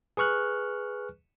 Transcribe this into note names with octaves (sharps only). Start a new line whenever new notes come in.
G#4 B4 C#6 F6 F#6